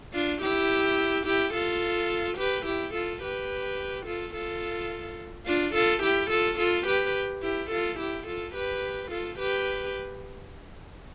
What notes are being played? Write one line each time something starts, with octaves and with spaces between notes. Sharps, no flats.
D4 F4
E4 G4
E4 G4
F4 A4
G4 B4
E4 G4
F4 A4
G4 B4
F4 A4
F4 A4
D4 F4
F4 A4
E4 G4
F4 A4
F4 A4
G4 B4
E4 G4
F4 A4
E4 G4
F4 A4
G4 B4
F4 A4
G4 B4